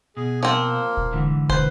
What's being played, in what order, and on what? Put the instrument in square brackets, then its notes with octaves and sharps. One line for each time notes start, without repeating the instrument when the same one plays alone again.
[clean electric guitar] B2 [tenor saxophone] G#4
[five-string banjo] F3 C4 [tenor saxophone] A#3
[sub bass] D#1
[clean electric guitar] G#2 D3 E3
[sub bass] E1 [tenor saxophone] B4 [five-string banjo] C5